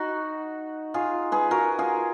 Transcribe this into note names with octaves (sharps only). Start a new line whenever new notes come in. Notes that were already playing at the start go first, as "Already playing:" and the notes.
Already playing: D#4 F#4
F4 G#4
G#4 B4
F#4 A#4
F4 G#4